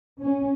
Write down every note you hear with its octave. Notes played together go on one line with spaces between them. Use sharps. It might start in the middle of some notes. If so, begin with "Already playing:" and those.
C#4